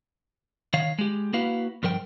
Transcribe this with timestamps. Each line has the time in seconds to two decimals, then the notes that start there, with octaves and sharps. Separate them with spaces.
0.74 D#3 C#5 F5
0.99 G#3 G4
1.33 A#3 E4 F#4 B4 F5
1.83 G2 F3 A#4 C5 G5